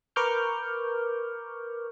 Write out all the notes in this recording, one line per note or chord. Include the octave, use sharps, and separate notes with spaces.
A#4 B4 C#6 D6 F6 G6